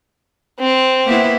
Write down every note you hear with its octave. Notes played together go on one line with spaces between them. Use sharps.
C4
A#3 B3 E4